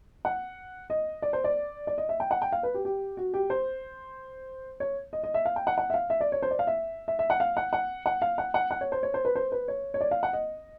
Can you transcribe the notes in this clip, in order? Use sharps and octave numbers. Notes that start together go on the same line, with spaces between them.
F#5
D#5
D5
C5
D5
D5
D#5
E5
G5
F#5
G5
F5
B4
G4
G4
F#4
G4
C5
C#5
D#5
D#5
E5
F5
G5
F#5
F#5
E5
F5
E5
D5
C#5
C5
D5
F5
E5
E5
E5
F#5
F5
F#5
F#5
F#5
F5
F#5
F#5
F#5
C#5
C5
C#5
C5
B4
C5
B4
C#5
C#5
D5
F5
F#5
D#5